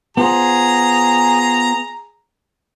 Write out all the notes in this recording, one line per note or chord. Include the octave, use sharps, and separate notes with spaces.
B3 F4 G#4 C5 A#5